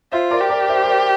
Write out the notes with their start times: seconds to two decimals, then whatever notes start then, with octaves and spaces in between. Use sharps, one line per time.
0.12 F4 C5 E5
0.31 A#4 D5
0.41 G4
0.49 A#4 D5
0.69 C5 E5
0.83 C5
0.87 A#4 D5